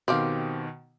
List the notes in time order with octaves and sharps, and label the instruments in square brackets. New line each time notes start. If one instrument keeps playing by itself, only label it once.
[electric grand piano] B2 D#3 [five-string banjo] C4 G4 F5